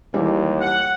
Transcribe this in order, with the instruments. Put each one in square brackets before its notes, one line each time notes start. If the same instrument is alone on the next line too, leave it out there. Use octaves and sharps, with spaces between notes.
[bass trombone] D#2 [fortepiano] E3 G3 G#3
[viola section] F#5